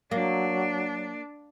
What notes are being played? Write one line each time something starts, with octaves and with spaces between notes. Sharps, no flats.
F#3 A#3 D4